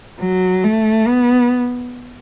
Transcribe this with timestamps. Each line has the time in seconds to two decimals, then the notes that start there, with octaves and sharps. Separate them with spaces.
0.20 F#3
0.64 A3
1.08 B3